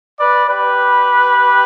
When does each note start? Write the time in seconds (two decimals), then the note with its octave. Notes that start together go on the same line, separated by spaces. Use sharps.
0.19 B4 D5
0.48 G4 B4